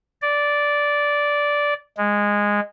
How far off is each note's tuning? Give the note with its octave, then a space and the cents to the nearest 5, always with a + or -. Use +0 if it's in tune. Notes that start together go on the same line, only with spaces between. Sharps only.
D5 -10
G#3 -15